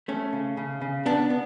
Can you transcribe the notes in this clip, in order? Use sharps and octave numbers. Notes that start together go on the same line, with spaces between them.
A3 C#4
C#3
C#3
C#3
B3 D4
B3